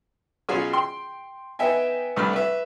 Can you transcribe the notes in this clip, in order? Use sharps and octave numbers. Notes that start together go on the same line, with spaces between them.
B2 F#3 C#4 F4 F#4 G#4
G5 C6
B3 D#4 E5 G5 G#5
C2 G2 A3 B5 F6
B4 E5